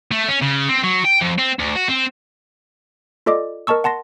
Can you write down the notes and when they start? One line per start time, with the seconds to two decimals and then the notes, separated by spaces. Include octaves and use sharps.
0.12 A3
0.28 C#4
0.42 C#3
0.69 C4
0.84 F#3
1.05 G5
1.22 F2
1.39 C4
1.59 D2
1.76 F#4
1.88 C4
3.26 F4 A4 D5 D#5 D6
3.67 A#4 D#5 A5 C#6 E6
3.84 F#5 A5 C6 A#6